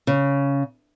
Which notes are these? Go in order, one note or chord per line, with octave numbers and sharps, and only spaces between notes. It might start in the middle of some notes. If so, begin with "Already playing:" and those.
C#3